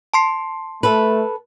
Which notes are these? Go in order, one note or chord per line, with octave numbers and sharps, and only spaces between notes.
A5 C6 C7
A3 A4 B4